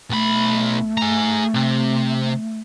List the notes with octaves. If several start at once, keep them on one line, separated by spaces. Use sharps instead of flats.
B1 A3 B5
G#4 A#5
C3